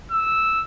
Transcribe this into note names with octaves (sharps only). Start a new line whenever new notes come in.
E6